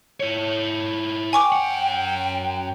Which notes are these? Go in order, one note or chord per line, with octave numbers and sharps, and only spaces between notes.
E4 C#5
G5 G#5 C#6 D6
F#2 F#5